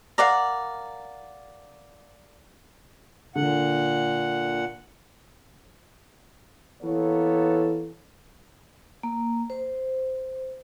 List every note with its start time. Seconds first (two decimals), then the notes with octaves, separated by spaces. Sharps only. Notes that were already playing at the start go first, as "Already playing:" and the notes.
0.18 A#4 D5 F5 F#5
3.36 A#2 D3 F#5
6.82 E3 A#3 B3 A4 C#5
9.03 A#3
9.50 C5